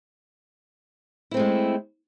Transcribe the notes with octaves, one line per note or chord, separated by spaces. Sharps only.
G#3 A3 C4 E4